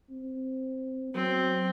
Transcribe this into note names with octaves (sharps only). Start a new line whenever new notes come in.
C4
F#3 C4